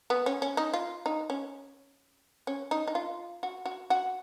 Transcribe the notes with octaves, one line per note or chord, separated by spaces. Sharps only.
B3
C#4
C#4
D#4
F4
D#4
C#4
C#4
D#4
D#4
F4
F#4
F#4
F#4